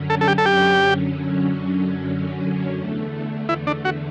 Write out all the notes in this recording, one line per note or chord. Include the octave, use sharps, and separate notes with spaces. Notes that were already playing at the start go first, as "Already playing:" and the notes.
Already playing: F#2 D3 F#3 C#4
A4
A4
G4
A4
G4
E2 D3 A3
E4
D4
F#4